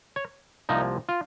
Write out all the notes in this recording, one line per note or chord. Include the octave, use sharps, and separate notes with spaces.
C#5
C2 C3 F3 A#3 D#4
F4